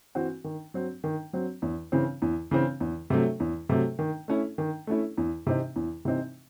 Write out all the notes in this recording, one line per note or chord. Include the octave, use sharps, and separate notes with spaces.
E3 C4 F#4
D#3
F#3 C4
D#3
F#3 C4
E2
C#3 E3 C4
E2
C#3 E3 C4
E2
C3 F#3 A3
E2
C3 F#3 A3
D#3
A3 C#4 E4
D#3
A3 C#4 E4
E2
C3 E3 C4 D#4
E2
C3 E3 C4 D#4